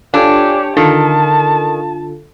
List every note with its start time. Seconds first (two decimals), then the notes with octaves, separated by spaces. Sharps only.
0.14 D4 F4 G4 A4 C#5 G#5
0.77 D3 D#3 F4 A4 A5